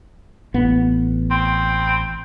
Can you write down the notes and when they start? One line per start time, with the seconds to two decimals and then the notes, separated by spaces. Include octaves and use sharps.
0.54 A1 B3
1.31 C4